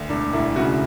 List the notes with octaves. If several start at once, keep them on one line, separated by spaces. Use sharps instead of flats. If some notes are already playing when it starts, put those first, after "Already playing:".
Already playing: D2
E1 D4
E1 E4
C#3 F#4